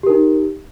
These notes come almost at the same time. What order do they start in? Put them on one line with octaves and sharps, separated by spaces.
G4 A#4 D#4